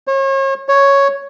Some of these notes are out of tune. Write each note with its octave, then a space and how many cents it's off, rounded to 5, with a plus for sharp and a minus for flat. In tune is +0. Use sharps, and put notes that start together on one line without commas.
C#5 -40
C#5 +0